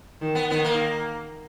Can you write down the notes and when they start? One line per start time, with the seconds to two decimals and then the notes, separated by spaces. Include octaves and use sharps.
0.22 D#3
0.35 B3
0.49 D#3 B3
0.64 A#3